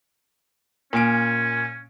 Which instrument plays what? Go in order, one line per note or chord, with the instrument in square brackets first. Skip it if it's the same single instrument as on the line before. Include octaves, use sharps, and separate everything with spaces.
[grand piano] A#2 G#5 D7 [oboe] C#4